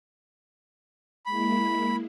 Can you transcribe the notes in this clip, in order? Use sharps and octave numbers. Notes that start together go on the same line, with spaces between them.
G#3 A#3 E4 B5